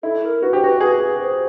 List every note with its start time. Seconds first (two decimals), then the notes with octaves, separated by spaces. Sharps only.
0.03 E4 A4
0.23 A#4
0.42 F#4 B4
0.53 G4 C5
0.61 F#4 B4
0.80 G#4 B4
1.21 C5